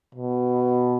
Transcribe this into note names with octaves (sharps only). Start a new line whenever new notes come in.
B2